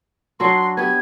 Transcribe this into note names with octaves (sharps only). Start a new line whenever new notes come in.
F#3 D4 F#4 C6
B3 G4 G#6